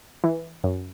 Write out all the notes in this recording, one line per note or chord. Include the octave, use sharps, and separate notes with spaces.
E3
F#2